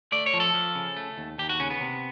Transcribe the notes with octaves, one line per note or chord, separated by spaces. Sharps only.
A3 D5
C#5
F3
A4
F3
C#3
A3
D#2
D#2 G4
F#4
C#3 C#4
B3
C3